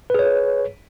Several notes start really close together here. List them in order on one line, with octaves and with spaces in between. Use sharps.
B4 G#4 C#5